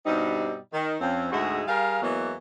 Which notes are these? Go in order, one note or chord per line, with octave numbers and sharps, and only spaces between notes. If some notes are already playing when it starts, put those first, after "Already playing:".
G2 B2 G3 C4 D#4
D#3
F2 C4 C#4
D2 G#2 G#3 F#4 G#4 E5
G3 G#4 A#4 F5
E2 E3 F#3 G#3 A#3 B3